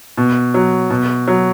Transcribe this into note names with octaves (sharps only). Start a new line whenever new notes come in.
B2
F#3
B2
F#3